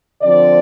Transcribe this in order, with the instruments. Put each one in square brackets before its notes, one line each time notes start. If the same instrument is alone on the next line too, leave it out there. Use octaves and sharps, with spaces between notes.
[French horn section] D3 F3 C4 D5